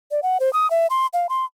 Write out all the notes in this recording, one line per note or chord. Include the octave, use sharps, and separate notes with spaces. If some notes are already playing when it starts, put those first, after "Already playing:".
D5
F#5
C5
D#6
E5
C6
F5
C6